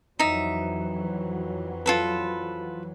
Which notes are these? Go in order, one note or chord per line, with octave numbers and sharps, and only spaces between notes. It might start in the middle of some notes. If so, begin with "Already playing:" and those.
F2 E3 F#3 D#4 E5
F4 A4 B4